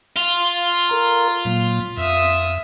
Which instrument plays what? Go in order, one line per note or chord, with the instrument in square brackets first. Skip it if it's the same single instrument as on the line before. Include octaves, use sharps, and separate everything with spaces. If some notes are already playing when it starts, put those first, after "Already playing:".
[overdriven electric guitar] F4
[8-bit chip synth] A4 A#4 A#5
A#2 F#3 A#3
[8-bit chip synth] F2 [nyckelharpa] E5 D#6